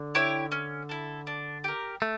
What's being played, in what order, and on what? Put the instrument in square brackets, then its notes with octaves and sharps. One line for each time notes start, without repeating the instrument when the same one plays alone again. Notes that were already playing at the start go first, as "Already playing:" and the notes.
Already playing: [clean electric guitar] D3
[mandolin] E4 G4 C#5
C#4
E4 A4
D4
G4 A#4
[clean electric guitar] A3